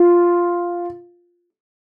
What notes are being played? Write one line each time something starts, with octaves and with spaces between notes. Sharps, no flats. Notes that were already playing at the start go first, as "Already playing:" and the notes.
Already playing: F4